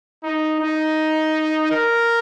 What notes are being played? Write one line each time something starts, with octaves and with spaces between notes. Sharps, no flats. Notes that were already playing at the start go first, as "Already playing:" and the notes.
D#4
D#4
A#4